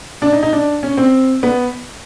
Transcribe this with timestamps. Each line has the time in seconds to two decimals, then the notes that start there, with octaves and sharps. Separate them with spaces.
0.22 D4
0.33 D#4
0.43 D#4
0.53 D4
0.83 C#4
0.97 C4
1.43 B3